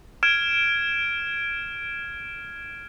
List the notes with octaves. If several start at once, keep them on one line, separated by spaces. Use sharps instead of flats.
F6 G#6 D7 E7